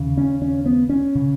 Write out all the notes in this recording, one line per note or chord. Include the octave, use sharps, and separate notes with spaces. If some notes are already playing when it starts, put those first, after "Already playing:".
Already playing: D#2 C#3
C#4
C#4
B3
C#4
C#3